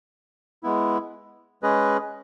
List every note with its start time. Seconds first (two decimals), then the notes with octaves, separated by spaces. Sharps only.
0.63 G#3 B3 E4
1.63 G#3 C#4 G#4 B4 D#5